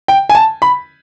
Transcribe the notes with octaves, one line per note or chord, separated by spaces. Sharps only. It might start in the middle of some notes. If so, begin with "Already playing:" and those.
G5
G#5
A5
B5